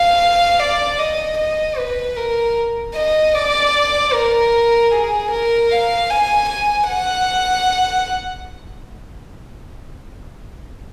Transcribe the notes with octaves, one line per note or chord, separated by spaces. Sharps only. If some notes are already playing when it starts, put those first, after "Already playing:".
Already playing: F5
D5
D#5
D#5
B4
A#4
D#5
D5
A#4
G#4
A#4
F5
G#5
G#5
F#5